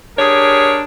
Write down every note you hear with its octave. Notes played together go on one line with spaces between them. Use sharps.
D4 G4 G#4 A#4 C#5